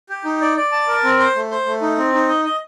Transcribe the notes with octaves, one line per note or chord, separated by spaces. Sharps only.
G4
D#4
D5
D5
A5
A#4
C4
C5
A3
C5
A3
D#4
C4
D#4
D#5
D#5